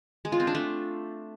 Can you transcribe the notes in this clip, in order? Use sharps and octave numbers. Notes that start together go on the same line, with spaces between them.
G#3
F4
C4
D4
A3